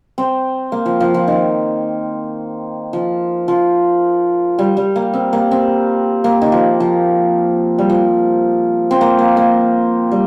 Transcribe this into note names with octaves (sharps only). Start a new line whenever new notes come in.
C4
A#3
F3
F3
F3
D#3
F3
F3
G3
G3
A#3
C4
A#3
C4
A#3
D#3
F3
F3
G3
F3
C4
A#3
A#3
A#3
G3